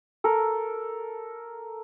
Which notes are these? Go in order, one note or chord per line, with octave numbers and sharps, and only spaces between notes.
A4 A#4